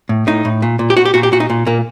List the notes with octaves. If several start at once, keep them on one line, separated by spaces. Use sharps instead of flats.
A2
A2 D#4
A2
A#2
A#2
G4
A#2 F#4
G4
A#2 F#4
G4
A#2 F#4
D#4
A#2
A#2 A#3